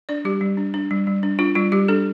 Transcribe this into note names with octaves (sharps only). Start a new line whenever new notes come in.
D4 D5
G3 G4
G3
D4
D4
G3
G3
D4
D4 F4
G3 F4
G3 G4
D4 A4